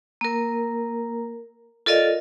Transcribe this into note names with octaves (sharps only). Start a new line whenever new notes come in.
A#3 A#4
F4 A4 A#4 D5 D#5 F5